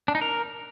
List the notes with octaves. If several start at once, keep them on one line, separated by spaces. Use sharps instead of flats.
D4
D#4
A#4